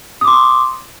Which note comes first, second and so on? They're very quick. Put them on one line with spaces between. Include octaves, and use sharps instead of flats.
D#6 D6 C6